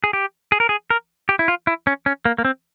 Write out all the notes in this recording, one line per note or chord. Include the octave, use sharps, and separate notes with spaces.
G#4
G4
G#4
A#4
G#4
A#4
G4
E4
F4
E4
C#4
C#4
A#3
A#3
C4